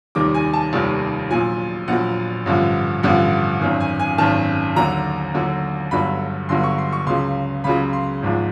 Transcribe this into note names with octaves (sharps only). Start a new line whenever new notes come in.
F1 D#2 D#3 G3 D6
G#5
A5
F1 D#2 D#3 G3
A#1 A#2 F#3 G#5
A#1 A#2 F#3 F#5
A1 G2 D3 F3
A1 G2 D3 F3 F#5
G#1 F#2 D#3
G#5
G#5
G#1 F#2 D#3 A5
D#2 D3 F#3 A#5
D#2 D3 F#3
G1 G2 D3 F#3 B5
G1 G2 D3 F#3 C6
C#6
C6
C#6
C#2 C#3 F#3 C6
C#2 C#3 F#3 B5
C6
G#1 G#2 F3